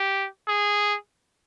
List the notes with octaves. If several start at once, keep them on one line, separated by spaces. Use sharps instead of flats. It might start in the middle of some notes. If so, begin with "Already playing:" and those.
Already playing: G4
G#4